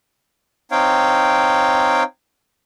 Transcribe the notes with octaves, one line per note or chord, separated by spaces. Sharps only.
C4 D#4 C#5 F5 G5